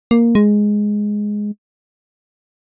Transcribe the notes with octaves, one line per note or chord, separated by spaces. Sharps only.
A#3
G#3